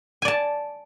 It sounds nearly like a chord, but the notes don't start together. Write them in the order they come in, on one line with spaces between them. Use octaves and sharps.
G#5 D5 A5